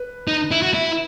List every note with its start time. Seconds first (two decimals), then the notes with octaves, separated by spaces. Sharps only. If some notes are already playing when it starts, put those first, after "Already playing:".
Already playing: B4
0.28 D#4
0.51 E4
0.63 F#4
0.74 E4